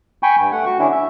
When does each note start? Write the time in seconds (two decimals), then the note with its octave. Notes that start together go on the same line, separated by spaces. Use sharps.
0.23 G5 G#5 B5 C#6
0.40 G2
0.52 A3 F#5
0.66 F#4 C#6
0.79 D3 C#4 D4 E4
0.91 E5